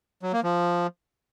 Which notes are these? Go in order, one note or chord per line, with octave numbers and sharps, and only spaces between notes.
F#3
A#3
F3